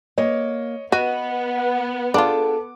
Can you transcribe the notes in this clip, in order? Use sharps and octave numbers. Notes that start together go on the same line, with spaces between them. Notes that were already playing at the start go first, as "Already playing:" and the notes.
A#3 C#5 D#5
B3 F#4 D#5 D#7
D4 F4 G#4 A4 G5 A5 D6